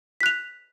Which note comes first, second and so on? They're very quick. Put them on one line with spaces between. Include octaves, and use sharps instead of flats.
B6 F#6 F7